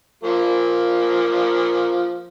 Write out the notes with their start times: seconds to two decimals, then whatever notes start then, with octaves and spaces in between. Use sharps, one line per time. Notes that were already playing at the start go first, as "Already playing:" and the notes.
0.24 F3 A#3